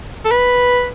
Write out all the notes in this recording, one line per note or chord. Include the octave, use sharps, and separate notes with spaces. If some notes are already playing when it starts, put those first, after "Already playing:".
A4
B4